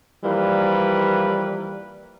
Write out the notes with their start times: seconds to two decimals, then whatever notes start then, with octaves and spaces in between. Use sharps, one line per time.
0.24 E3 F3 G3 A#3 A#4 B4